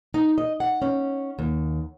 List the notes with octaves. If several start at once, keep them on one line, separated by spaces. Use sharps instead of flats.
D#4
D#5
F#5
C#4
D#2